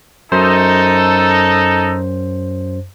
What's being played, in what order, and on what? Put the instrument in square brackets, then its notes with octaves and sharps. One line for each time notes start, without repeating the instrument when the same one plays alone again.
[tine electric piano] F#2 C5 [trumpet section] D#4 A4